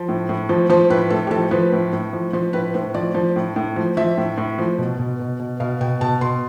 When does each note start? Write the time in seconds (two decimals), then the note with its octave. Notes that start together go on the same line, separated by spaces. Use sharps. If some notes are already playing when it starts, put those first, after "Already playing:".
Already playing: F3
0.09 A2
0.29 A2
0.49 F3
0.70 F3 C5
0.90 A2 B4
1.10 A2 A4
1.27 G4
1.31 F3 A4
1.51 F3 B4
1.72 A2
1.93 A2
2.13 F3
2.33 F3 C5
2.53 A2 B4
2.74 A2 C5
2.94 F3 D5
3.15 F3
3.36 A2
3.56 A2
3.76 F3
3.97 F3 E5
4.17 A2
4.38 A2
4.59 F3
4.78 B2
4.99 B2
5.19 B2
5.40 B2
5.60 B2 F5
5.81 B2 G5
6.01 B2 A5
6.21 B2 C6